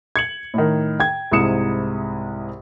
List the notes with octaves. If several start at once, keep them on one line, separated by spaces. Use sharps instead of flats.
G#6 C#7 F#7
A2 D#3
G5 G#6
C2 G#2 E4 D#6 C#7 E7